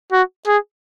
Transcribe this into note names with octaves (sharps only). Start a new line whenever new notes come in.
F#4
G#4